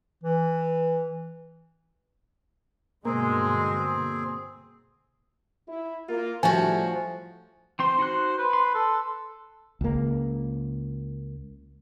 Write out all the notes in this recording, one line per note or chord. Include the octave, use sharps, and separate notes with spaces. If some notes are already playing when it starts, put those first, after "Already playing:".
E3
G2 B2 D3 G#3 A#3 C4 G#4
E4
A#3 F4 A#4
A2 F3 G3 A3 F#4 G#5
E3 C4 C5 C6
D#4 F#4 F#6
B4
C6
A4
C#2 A#3